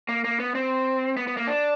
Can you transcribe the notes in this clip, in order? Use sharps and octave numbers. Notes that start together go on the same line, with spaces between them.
A#3
A#3
B3
C4
B3
B3
A#3
D4